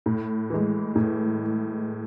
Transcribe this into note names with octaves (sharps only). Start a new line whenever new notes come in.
A2
E3 G#3
A2